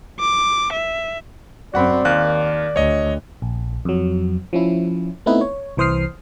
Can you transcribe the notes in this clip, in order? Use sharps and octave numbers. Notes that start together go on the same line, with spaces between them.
D6
E5
F#2 C4 F#4 D5 F#5 B5
D#2 D#3 F5 F#6
D2 C#5 D#5
A#1
F2 F#3
F3 C#4 E4
A3 B3 C4 D#4 E4 B4
C#5
C2 E3 C5 D#6 F6 C7